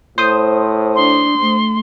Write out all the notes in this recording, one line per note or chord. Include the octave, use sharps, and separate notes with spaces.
A2 C5 D#6
D4 C6
A3